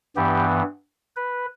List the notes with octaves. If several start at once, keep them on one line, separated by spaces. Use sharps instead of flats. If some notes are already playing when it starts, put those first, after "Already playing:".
G2 E3 B3 G4
B4